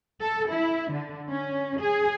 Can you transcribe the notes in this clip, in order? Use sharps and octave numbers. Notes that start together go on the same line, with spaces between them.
A4
E4
D3
C#4
G#4